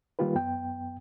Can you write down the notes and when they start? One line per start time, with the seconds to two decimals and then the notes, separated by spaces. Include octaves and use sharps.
0.19 D#3 G3 A#3 F4 G4 B4
0.35 F#2 B3 G5